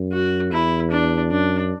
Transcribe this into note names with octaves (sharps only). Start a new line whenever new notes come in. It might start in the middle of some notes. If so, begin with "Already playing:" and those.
Already playing: F#2
F#4
E2 E4
D4
F#2 D4